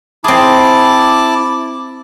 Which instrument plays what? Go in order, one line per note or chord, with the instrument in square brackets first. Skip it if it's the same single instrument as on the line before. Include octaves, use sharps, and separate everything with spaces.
[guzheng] C4 G#4 [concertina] E4 A5 D6